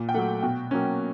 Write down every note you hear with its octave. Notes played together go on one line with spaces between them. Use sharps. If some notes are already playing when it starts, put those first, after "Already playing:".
Already playing: A#2
G5
F#3 A3 F#5
B2 G5
F#3 A#3 C#4